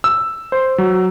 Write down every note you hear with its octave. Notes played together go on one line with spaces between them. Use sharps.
E6
C5
F#3